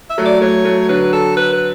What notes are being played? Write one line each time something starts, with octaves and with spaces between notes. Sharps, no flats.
E5
F#3 A3
D5
F#3 A3 C#5
F#3 A3
D3 F#3 B4
A4
B4
B4